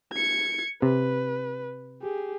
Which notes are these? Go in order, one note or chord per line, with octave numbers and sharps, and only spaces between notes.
G#6 C#7
C3 B4
G4 G#4